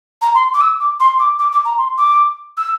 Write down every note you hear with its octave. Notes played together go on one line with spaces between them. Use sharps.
A#5
C6
D6
E6
D6
C6
D6
D6
D6
A#5
C6
D6
E6